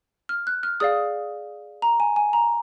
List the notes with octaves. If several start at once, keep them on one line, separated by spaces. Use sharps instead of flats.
F6
F#6
F6
G#4 D5 F5 D#6
A#5
G#5
G#5
A#5